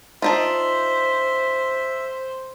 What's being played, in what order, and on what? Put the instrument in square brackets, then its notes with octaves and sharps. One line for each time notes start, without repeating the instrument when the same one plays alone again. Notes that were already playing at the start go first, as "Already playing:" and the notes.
[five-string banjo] D4 D#4 F4 [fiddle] C5 [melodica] E5